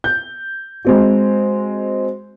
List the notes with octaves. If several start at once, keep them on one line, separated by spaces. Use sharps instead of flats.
G6
G#3 C4 F#4